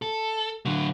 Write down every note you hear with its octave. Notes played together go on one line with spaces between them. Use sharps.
A4
D3 F#3